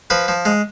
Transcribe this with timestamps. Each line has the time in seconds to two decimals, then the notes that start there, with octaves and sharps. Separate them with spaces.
0.10 F3 B4
0.28 F3
0.45 G#3